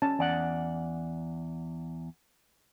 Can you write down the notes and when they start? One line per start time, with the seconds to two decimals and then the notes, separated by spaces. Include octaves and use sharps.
0.02 C#4 A5
0.19 E2 D5 F#5